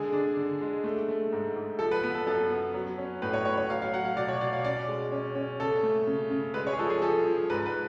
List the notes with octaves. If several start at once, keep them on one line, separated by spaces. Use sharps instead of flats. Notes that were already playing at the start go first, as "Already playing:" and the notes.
Already playing: D3 G#3 G#4
D4
D3
G#3
A3
A3
G#2
G#2
F3 A4
B4
B3 B4
A4
F#2 A4
B3
F#3
C#4
A2 B4
C#5
A2 C#5
C#5
F#3 F5
F5
F#3 F#5
F5
B2 D5
C#5
B2 D5
F5
C#4 D5
G#3
C#4
C#4
C#3 A4
A3
C#3
C#3
G#3 B4
C#5
G#4
F3 A4
G#4
F3 A4
F3
G#2 B4
B4